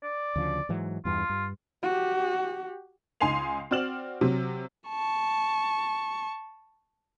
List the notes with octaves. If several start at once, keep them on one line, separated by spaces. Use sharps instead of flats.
D5
D2 C#3 F3
G#2 E3 F#3
E2 G2 F4
G2
F#4 G4
C#2 D#4 G#5 C6 C7 F7
C4 F#4 D5 F6 E7 F#7
C3 F#3
A5 C#6